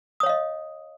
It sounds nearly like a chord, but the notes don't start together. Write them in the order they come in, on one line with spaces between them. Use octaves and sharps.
D#6 C#5 F5 D#5